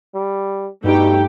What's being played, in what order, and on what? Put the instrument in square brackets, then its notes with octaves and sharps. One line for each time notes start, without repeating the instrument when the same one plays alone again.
[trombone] G3
[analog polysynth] G2 G5 [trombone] B2 [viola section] A3 G4 [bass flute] D#4